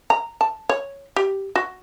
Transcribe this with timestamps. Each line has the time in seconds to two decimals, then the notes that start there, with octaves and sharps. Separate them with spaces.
0.10 A#5
0.41 A5
0.69 C#5
1.16 G4
1.56 F#4